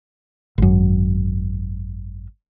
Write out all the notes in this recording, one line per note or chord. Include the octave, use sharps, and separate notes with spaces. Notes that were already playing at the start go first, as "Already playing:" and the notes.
G#1 F#2